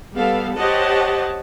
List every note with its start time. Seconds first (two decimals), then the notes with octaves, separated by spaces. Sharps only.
0.16 G3 B3 A4 F5
0.56 G4 C5 C#5 D#5 F#5 A5